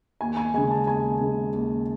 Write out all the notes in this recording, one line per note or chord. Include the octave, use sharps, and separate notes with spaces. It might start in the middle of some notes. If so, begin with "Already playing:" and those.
D#2 G#5
G#5
C#3 G#3 G#5
A5
D#2 G#5
C#3 G#3
D#2